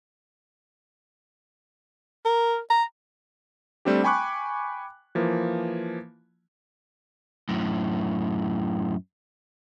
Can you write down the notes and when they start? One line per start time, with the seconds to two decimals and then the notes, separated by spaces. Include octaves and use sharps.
2.25 A#4
2.70 A#5
3.85 G3 A3 C4 D4 G4
4.04 G5 G#5 B5 C#6 D6 F#6
5.15 E3 F3 A#3
7.49 F#2 A2